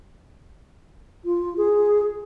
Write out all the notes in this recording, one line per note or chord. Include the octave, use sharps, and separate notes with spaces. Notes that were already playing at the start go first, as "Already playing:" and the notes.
F4
G#4